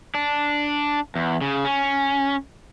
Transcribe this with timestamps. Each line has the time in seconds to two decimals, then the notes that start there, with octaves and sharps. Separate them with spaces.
0.15 D4
1.15 E2
1.41 C#3
1.65 C#4